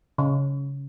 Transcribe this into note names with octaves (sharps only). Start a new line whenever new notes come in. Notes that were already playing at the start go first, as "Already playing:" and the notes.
C#3